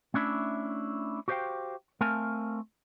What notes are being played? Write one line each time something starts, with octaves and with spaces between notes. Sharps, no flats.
A3 C#4 D4 E4 E5
F#4 G4 C5 E5 F5 G5
A3 C4 A#4 F5 G#5 A5